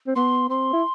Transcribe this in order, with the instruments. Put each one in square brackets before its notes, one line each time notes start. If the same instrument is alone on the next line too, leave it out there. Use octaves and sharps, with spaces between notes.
[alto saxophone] C4
[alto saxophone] B3 [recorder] C6
[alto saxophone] C4 [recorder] C6
[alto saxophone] E4